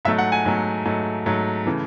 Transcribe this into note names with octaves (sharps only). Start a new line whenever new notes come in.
G#2 F#3 A3 E5
F#5
G#5
G#2 F#3 A3
G#2 F#3 A3
G#2 F#3 A3
C#3 E3 A3